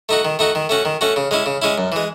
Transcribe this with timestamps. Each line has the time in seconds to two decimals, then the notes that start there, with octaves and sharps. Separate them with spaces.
0.09 A3 D#4 F#4
0.25 D#3
0.39 A3 D#4 F#4
0.55 D#3
0.69 A3 C#4 F#4
0.85 D#3
1.01 A3 C#4 F#4
1.16 C#3
1.31 G#3 C#4 E4
1.46 C#3
1.62 G#3 C#4 E4
1.78 F#2
1.92 E3 G#3